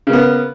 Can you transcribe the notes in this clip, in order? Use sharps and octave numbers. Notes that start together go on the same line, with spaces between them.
C#3 A#3 B3